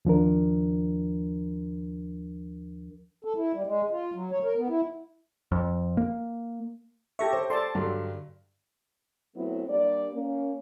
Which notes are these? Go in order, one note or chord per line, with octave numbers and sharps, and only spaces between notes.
D#2 F3 D4 A#4
A4
E4
G3
G#3
F4
F#3
C#5
A#4
B3
E4
F2
A#3
G4 A4 E5 C#6 A#6
C5
A4 D5 A5 C6
G2 D3 F#3
F#3 A3 B3 C4 E4
G3 A#3 D4 D5
A#3 C#4